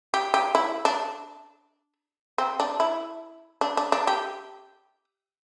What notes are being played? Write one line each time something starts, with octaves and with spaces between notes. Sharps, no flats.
G4
G4
E4
D4
C4
D4
E4
D4
D4
D4
G4